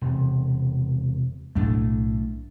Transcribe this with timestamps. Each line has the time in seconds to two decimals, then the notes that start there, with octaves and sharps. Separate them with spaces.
0.01 E1 C3
1.55 B1 A2 A3 D4